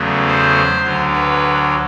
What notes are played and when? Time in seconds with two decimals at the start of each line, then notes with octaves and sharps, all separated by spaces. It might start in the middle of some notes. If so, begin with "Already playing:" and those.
Already playing: E2 C#3 F#3 A3
0.27 C5
0.84 D2 D3 F#3
1.13 B4